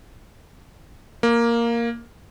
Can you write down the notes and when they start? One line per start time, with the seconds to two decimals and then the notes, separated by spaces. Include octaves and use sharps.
1.23 A#3